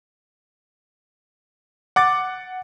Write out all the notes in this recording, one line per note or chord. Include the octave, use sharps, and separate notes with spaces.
F#5 D6 A6